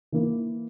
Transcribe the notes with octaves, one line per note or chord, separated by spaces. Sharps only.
E3 A#3 E4